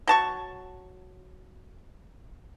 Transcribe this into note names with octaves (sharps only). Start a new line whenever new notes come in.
F#3 A5 C#6